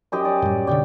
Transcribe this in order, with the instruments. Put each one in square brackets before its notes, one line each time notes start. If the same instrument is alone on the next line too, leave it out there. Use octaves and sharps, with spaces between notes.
[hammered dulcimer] F#2 G4 D#5
D5
[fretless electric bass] F#2 A2 G3
[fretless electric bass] F#2 B2 D3 [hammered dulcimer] D5 G5